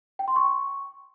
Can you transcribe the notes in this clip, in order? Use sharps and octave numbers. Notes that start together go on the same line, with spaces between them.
G5
C6
C#6